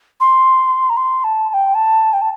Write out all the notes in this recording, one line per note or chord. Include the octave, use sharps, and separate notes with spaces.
C6
A#5
C6
A5
A5
G5
A5
G5
A5